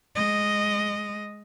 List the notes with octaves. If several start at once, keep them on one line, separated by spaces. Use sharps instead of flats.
G#3 D#5